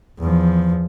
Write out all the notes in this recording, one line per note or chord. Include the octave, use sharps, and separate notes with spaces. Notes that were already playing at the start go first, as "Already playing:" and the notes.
E2 F3